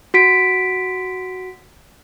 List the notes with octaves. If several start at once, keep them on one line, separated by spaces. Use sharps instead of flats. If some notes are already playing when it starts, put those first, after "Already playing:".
F#4 B6 D7